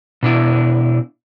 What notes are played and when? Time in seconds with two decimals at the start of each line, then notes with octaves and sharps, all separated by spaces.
0.23 B2 D4 E4